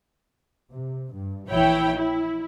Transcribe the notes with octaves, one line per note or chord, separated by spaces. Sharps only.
C3
G2
A#1 E3 E4 C#5 G5
E4